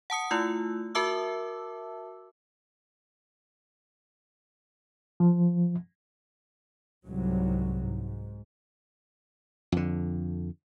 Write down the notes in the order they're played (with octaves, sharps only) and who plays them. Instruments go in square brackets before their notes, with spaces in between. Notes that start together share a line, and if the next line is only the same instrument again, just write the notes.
[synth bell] F#5 A5 D#6 C#7
A3 E4 F4 E6
F#4 A#4 E5 A5 D6 E6
[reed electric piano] F3
[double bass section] C2 G#2 F#3
G#2
[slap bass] F2 D3